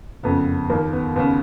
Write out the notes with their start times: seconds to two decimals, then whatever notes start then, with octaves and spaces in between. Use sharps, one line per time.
0.23 F#1 F2 C#3 B3
0.70 D#2 A#3
0.73 D#3
0.93 B3
1.16 D#2 C#3 B3